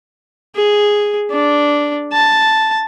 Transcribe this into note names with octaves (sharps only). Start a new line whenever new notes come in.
G#4
D4
A5